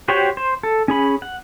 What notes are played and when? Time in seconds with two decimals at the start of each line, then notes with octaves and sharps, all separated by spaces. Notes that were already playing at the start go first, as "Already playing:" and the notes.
0.08 F#4 G4 C5 C#5 G5
0.37 C5
0.63 A4
0.88 C#4 G#4 B5
1.22 F#5